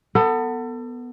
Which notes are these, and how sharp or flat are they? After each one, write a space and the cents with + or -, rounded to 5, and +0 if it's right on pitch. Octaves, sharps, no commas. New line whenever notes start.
B3 +0 A4 +30